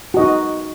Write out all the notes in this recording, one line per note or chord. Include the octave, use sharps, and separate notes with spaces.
D#4 F#4 D#5